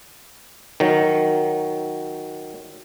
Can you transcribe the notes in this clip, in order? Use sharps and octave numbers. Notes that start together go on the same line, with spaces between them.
D#3 F#3